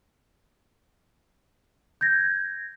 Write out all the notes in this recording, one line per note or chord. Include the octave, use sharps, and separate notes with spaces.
G6 G#6 A#6